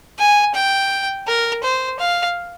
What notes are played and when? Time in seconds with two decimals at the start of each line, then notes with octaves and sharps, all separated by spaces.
0.19 G#5
0.54 G5
1.27 A#4
1.63 C5
1.99 F5